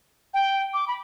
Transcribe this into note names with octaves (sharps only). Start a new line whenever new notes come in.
G5
D6
B5